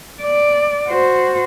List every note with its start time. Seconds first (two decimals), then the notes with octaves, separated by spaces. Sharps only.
0.22 D5
0.88 F#4 C5